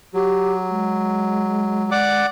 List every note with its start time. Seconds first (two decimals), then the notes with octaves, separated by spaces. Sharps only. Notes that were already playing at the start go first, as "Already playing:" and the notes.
0.14 F#3 G4
0.70 G#3
1.91 D5 F#5 D6